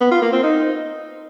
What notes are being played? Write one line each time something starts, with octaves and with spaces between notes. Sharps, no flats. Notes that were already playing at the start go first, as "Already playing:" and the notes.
B3
F4
A#3
C4
D#4